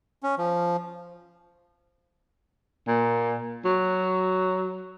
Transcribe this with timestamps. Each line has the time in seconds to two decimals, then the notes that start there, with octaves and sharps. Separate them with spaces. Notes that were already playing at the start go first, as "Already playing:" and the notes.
0.23 C#4
0.38 F3
2.87 A#2
3.65 F#3